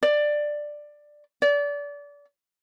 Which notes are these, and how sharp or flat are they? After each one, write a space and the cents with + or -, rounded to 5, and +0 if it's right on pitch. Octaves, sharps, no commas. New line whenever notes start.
D5 +10
D5 -30